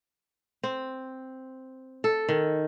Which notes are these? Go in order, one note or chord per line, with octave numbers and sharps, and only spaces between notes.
C4
A4
D#3